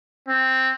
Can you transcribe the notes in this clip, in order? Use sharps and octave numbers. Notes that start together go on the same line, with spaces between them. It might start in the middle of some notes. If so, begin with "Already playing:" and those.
C4